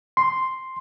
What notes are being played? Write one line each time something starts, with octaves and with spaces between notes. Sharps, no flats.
C6